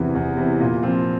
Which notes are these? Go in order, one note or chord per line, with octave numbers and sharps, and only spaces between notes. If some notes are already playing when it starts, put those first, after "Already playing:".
Already playing: E2 C3 E3
E2
C3 E3
A#2
F3 C4 F4